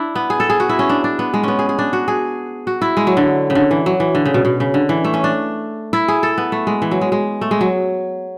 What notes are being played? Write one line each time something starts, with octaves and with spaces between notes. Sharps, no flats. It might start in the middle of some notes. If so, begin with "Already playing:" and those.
Already playing: D4 E4
B3
G#4
A4
G#4
F#4
E4
C#4
D4
D4
B3
G#3
B3 C#4
G#4
G#4
D4
F#4
G#4
F#4
E4
G#3
F#3
D3
C#3
D3
E3
F#3
E3
D3
C#3
B2
B2
C#3
D3
E3
A3
C#4
D4
E4
G#4
A4
B3
A3
G#3
E3
F#3
G#3
G#3
A3
G#3
F#3